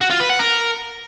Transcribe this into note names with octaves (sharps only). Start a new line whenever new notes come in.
F#4
F4
B4
F#5
A#4